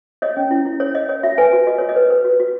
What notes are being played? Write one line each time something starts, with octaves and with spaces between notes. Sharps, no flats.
C#5 D#5
C#4
E4
E4
C#5
C#5 D#5
C#5
F#4 E5
B4 G#5
F#4
F#4 D#5
F#4 C#5
D#5
B4
B4
F#4
F#4